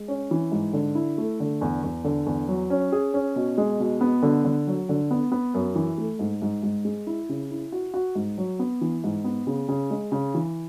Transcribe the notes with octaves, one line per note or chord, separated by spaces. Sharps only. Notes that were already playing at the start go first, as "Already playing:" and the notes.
Already playing: G#3
C#4
E3
G#2
D3
E4
A3
D3
E2
E2
D3
E2
F#3
C#4
G#4
C#4
B2
G#3
B2
B3
D3
D3
F#3
D3
B3
B3
F#2
E3
A3
G#2
G#2
G#2
G#3
E4
C#3
E4
F#4
F#4
G#2
F#3
B3
E3
G#2
B3
C#3
C#3
G#3
C#3
E3